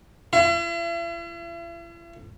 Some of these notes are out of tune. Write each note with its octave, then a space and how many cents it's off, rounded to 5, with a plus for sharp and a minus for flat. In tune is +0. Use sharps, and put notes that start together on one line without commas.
E4 +45